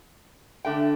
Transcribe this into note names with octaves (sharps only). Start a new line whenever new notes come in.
D3 A3 D4 G5